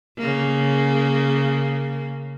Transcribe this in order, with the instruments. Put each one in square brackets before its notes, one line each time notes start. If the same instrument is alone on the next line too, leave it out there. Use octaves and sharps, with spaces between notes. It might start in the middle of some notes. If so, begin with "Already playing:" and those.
[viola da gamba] C#3 A#3